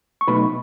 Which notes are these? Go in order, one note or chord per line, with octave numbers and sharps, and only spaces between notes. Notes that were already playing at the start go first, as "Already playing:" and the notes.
C#6
B2 F#3 A3 D#4 B4 B5